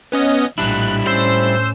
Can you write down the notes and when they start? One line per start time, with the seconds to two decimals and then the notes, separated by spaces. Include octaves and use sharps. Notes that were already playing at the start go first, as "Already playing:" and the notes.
0.12 B3 C#4 D#5
0.58 A#1 A2 G3 D4 E4 F#6
1.07 A2 C#4 C5 E6